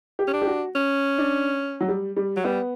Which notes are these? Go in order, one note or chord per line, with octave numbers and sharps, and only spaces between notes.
G4
C#4
D4
G4
F#4
C#4
D4
F#3
G3
G3
F#3
G3 B3